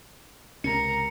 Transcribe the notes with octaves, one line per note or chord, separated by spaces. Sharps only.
C#2 C3 C#4 A#4 A#5 C#7